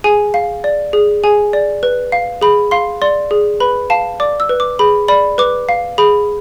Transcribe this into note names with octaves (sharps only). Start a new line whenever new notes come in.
G#4 G#5
F5
D5
G#4
G#4 G#5
D5
B4
F5
G#4 B5
F5 C6
D5 C6
G#4
B4 B5
F5 A5
D5 D6
E6
B4
D6
G#4 B5
D5 B5
B4 D6
F5
G#4 B5